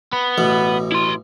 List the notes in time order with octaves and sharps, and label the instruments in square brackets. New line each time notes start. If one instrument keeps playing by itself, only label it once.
[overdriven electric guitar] B3
[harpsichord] A1 B2
[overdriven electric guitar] E4 C6